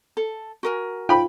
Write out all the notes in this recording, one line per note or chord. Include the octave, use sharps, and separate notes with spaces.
A4
F#4 A#4 G#5
F4 G5 B5